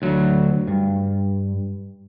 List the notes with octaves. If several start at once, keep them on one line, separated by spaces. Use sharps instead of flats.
D2 F#3
G2